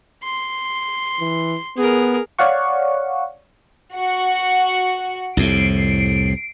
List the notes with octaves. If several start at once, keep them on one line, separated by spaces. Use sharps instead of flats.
C6
E3
B3 G#4 A#4
C#5 D5 F5 F#5 C#6
F#4 C#7
C2 F2 A2 C7 D7